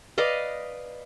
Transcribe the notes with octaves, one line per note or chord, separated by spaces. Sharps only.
B4 D5 D#5 F5